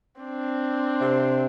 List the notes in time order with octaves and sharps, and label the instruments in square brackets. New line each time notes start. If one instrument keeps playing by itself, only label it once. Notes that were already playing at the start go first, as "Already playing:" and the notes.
[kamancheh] C4 D4
[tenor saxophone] C3